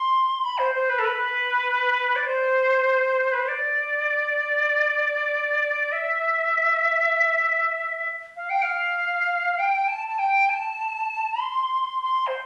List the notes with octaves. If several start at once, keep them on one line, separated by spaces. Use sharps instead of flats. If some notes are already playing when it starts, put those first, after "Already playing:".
Already playing: C6
B5
C5
C5
B4
A4
B4
D5
C5
B4
C5
D5
E5
F5
G5
F5
G5
A5
A5
G5
A5
C6
C6
C5